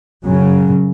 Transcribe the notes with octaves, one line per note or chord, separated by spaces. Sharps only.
F#2 C#3 F#3